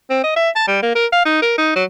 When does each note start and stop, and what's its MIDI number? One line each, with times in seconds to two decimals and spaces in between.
0.10 0.23 60
0.24 0.34 75
0.36 0.50 76
0.56 0.64 81
0.68 0.81 55
0.83 0.91 58
0.95 1.06 70
1.12 1.24 77
1.25 1.39 63
1.42 1.55 70
1.58 1.75 63
1.76 1.84 54